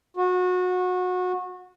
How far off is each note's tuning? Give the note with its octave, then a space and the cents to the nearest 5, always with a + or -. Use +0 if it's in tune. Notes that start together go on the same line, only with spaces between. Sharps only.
F#4 -25